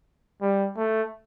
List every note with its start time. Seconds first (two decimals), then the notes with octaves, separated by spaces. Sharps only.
0.42 G3
0.77 A3